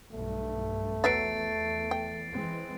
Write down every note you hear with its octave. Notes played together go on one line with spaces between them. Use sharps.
B1 G2 A3
E2 F#3 B4 E5 A6 C7 D7
G5
E3 G#3 C4